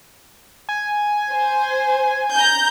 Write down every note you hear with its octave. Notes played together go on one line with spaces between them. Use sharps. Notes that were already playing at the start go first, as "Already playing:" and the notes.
G#5
C5
A#5 G6